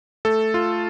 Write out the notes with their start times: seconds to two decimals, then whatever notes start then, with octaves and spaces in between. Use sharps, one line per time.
0.25 A3 A4
0.54 F4